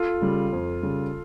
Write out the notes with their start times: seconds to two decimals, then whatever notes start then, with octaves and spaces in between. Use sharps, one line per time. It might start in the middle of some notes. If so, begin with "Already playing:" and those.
Already playing: F4 A4
0.21 C#3 G3
0.52 F2
0.82 C#3 G3